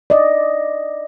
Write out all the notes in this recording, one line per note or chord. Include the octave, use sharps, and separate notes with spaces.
D5 D#5